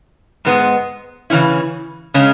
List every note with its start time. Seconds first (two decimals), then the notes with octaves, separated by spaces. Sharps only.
0.45 G#2 G#3 B3
1.30 C#3 E3 C#4 E4
2.14 C#3 G#3 C#4